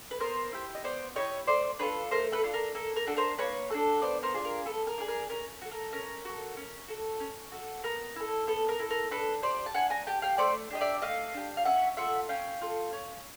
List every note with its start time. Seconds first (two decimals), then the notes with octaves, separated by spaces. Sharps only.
0.11 B4
0.20 B3 A#4 C5
0.52 E4 G4
0.75 D#5
0.84 B3 C5 D5
1.16 E4 G4 C#5 D#5
1.47 A3 C5 D5
1.79 D4 F4 A4 B4 C#5
2.11 A3 A#4 C5
2.32 A4 B4
2.43 D4 F4 A4
2.53 A#4
2.75 A#3 A4
2.96 A#4
3.07 D4 F#4 A4
3.17 A#4 C5
3.38 A#3 B4 C#5
3.70 D4 F#4 A4
4.02 B3 C5 D5
4.23 A#4 C5
4.34 D4 F4 G#4
4.45 A#4
4.66 B3 A4
4.87 A#4
4.98 D4 F4 G#4
5.08 A#4
5.29 C#4 A#4
5.61 F#4 A4
5.71 A#4
5.93 C#4 A#4
6.25 F#4 A4
6.57 C#4
6.88 F#4 A4
7.20 C#4
7.52 F#4 A4
7.84 B3 A#4
8.16 E4 A4
8.47 B3 A4
8.69 A#4
8.79 E4 A4
8.90 A#4
9.11 D4 A4 B4
9.42 G4 C5 D5
9.66 A5
9.74 D4 F#5 G#5
9.90 G#5 A#5
10.07 G4 G5 A5
10.22 F5 G5
10.38 A3 C5 D5
10.70 D4 G4 D#5
10.81 D5 E5
11.02 A3 D#5 F5
11.34 D4 G4
11.57 F5
11.65 C#4 E5 F#5
11.97 F4 A4 E5 F#5
12.29 C#4 F5 G5
12.61 F4 A4
12.93 C#4